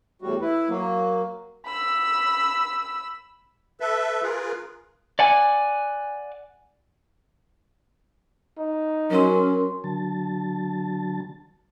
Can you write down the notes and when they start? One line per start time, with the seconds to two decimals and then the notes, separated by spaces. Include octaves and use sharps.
0.22 E2 A2 G3 F#4
0.42 E4 B4
0.69 F#3 A#3
1.67 B5 E6
3.80 A4 B4 E5
4.22 F4 G#4 A#4 B4
5.19 D5 F#5 G#5
8.58 D#4
9.10 F#3 C#4 A#4 C6
9.84 D3 F#3 A5